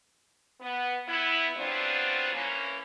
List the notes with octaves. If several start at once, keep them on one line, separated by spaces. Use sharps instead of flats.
B3
B3 E4
F#3 G3 B3 C4 D4 F4
E3 A#3 C#4